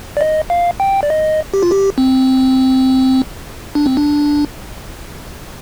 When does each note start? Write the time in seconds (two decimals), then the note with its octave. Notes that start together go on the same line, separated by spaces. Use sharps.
0.17 D5
0.21 D#5
0.50 F5
0.80 G5
1.03 D5
1.10 D#5
1.54 G4
1.63 F4
1.71 G4
1.98 C4
3.75 D4
3.86 C4
3.97 D4